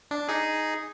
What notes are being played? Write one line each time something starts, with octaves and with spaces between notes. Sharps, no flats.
D4
D#4 G#4